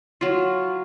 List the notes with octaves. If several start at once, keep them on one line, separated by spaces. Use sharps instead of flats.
F#3 F4